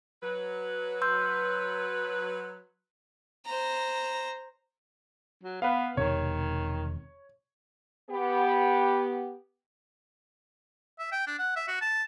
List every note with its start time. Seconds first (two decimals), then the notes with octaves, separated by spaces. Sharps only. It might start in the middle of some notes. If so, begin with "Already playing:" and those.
0.23 F#3 B4
1.02 C6 E6 G6
3.45 C5 A#5
5.43 F#3
5.62 B3 B4 F5
5.97 E1 C3 D#3 C#5
8.10 B3 G4
10.99 E5
11.12 G5
11.27 D4
11.39 F#5
11.56 E5
11.68 F#4
11.81 A5